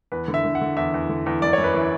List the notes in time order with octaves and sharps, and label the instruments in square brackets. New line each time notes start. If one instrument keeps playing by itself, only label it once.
[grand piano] E2 B4
D3
E5
D3
F#5
D3
E2 E5
E2
D3
E2
F#2 D5
F#2 C#5
B4
E3